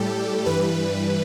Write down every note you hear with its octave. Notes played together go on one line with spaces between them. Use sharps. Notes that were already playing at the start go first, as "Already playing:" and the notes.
Already playing: A2 G3 G4 A4
G2 E3 G3 B4